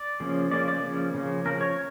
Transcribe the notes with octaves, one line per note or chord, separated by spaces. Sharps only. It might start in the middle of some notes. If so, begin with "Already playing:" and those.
Already playing: D5
C#3 F3 A#3 C#4
C#3 F3 A#3 C#4 D5
D5
C#3 F3 A#3 C#4
C#3 F3 A#3 C#4
F3 C#4 A#4
C#5